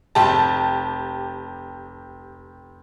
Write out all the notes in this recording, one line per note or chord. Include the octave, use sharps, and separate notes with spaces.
F1 G4 A5